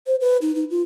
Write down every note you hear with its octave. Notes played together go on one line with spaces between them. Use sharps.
C5
B4
D#4
D#4
F4